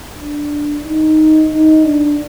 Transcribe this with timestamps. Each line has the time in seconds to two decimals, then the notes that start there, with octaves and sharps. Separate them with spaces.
0.17 D4
0.84 D#4
1.52 D#4
1.84 D4